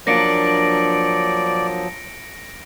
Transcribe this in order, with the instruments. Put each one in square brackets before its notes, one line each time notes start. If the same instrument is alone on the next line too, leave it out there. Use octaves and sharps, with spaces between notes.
[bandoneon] F3 F#3 [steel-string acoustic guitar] A#3 D4 [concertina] D5 [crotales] A#6 C#7 D7